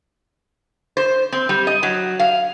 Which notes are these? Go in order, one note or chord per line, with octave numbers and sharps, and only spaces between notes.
C5
C4
G3
D#5
F#3
F5